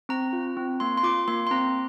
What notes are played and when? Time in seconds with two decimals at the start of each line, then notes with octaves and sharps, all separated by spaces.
0.09 C4 A#5
0.33 F4
0.57 C4
0.80 A#3 C6
0.97 C6
1.03 F4 D6
1.28 A#3 C6
1.47 C6
1.51 C4 A#5